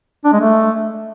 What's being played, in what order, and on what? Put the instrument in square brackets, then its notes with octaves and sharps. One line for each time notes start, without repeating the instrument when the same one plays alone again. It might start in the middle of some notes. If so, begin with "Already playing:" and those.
[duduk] D4
G#3
A3